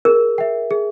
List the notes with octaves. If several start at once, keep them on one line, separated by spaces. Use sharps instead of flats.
G#4 A#4
E5 G5
G#4